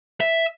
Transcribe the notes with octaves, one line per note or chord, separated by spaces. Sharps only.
E5